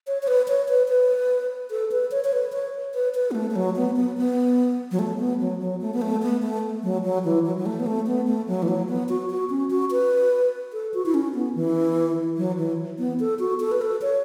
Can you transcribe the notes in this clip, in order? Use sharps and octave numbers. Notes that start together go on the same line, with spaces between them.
C#5
C#5
B4
C#5
B4
B4
A4
B4
C#5
C#5
B4
C#5
B4
B4
B3
A3
A3
F#3
B3
B3
B3
F#3
A3
B3
F#3
F#3
A3
B3
A3
B3
A3
F#3
F#3
E3
F#3
F#3
A3
B3
A3
B3
A3
F#3
E3
F#3
B3
F#4
F#4
C#4
F#4
B4
A4
F#4
E4
C#4
B3
E3
F#3
E3
B3
A4
F#4
A4
B4
A4
C#5